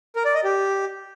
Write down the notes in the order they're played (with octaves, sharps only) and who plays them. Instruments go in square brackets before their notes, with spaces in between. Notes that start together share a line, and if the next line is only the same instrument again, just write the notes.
[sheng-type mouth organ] A#4
D5
D#5
G4